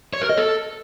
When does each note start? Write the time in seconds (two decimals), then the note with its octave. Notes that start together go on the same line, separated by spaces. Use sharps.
0.13 C#5
0.21 A#4
0.29 D#5
0.37 A4